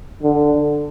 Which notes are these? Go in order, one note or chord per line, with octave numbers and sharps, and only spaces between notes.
D3